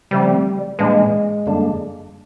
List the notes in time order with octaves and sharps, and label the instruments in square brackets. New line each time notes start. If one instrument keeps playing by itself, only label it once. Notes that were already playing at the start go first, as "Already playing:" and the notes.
[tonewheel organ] C#3 F3 A3 C4 [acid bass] G3
[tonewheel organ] A2 E3 G3 A#3 D4 [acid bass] G#3
[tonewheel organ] F#2 D3 G3 A#3 D4